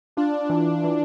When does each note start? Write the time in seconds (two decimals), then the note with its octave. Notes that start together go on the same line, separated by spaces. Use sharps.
0.17 D4 F4
0.50 E3
0.84 E3